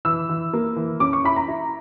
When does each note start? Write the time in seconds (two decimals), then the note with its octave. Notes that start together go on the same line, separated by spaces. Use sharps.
0.05 E3 E6
0.29 E3
0.53 A#3
0.76 E3
1.00 C#4 D6
1.13 C#6
1.24 E4 B5
1.36 A#5
1.48 E4